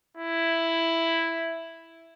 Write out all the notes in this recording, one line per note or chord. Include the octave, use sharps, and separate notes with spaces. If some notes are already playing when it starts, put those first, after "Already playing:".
E4